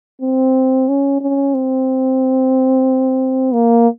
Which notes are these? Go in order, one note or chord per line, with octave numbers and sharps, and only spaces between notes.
C4
C#4
C#4
C4
A#3